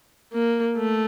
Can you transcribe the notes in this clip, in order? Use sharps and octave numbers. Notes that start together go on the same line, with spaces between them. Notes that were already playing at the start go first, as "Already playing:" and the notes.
A#3
A3